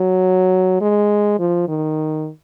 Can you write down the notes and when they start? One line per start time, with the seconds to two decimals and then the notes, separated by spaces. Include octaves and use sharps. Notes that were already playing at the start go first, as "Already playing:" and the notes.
Already playing: F#3
0.81 G#3
1.39 F3
1.68 D#3